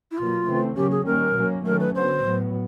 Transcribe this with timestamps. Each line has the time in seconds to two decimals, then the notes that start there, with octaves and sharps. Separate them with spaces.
0.11 E4
0.18 B2 F#3 A#3 F4
0.47 C#3 E3 A3 C4
0.76 C#3 F#3 A#3 C#4 G4
0.91 G#4
1.06 D#3 G3 A#3 C#4 A#4
1.36 B2 F#3 A#3 C#4
1.65 D#3 F#3 A3 C#4 A#4
1.80 B4
1.94 D3 F#3 B3 C5
2.24 A2 F#3 B3